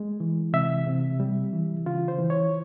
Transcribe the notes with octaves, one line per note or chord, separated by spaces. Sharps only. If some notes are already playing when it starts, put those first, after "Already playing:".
Already playing: G#3
E3
C3 E5
C3
G3
E3
C#3 F4
C5
E3
C#5